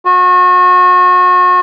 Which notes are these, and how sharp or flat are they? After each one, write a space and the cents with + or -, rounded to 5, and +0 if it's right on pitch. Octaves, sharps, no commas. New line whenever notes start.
F#4 -35